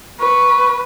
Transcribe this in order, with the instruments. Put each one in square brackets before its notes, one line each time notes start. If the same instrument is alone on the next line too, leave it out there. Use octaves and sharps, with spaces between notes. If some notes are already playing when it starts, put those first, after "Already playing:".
[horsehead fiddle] B4 [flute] C#6